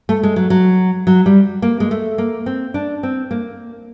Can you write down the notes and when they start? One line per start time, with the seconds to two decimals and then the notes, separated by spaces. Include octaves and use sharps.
0.09 A3
0.23 G#3
0.36 F#3
0.50 F#3
1.07 F#3
1.26 G3
1.62 A#3
1.80 G#3
1.91 A3
2.18 A#3
2.46 C4
2.74 D4
3.03 C4
3.31 A#3